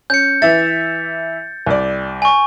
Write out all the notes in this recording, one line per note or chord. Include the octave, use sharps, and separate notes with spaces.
C#4 G6 C#7
E3 E5 A6
C2 D5
G#5 C#6